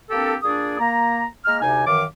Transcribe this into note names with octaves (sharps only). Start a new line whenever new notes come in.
A#3 C4 D4 G4 A4
A#2 D4 G#4 D5 D#6
A#3 A#5
G#3 A#3 A#5 F6
D2 C3 D#4 G#5
F#2 D#3 E3 F5 D6